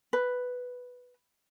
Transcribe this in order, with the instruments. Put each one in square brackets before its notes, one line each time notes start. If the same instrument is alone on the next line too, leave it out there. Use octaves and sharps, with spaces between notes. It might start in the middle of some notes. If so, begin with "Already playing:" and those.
[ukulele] B4